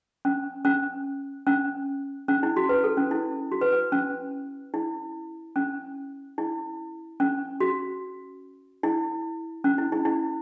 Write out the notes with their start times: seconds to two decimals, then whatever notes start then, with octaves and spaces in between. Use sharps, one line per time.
0.25 C#4
0.65 C#4
1.47 C#4
2.28 C#4
2.43 E4
2.56 F#4
2.69 B4
2.84 A4
2.97 C#4
3.11 E4
3.52 F#4
3.61 B4
3.72 B4
3.92 C#4
4.74 E4
5.56 C#4
6.38 E4
7.20 C#4
7.60 F#4
8.83 E4
9.64 C#4
9.78 E4
9.92 E4
10.05 E4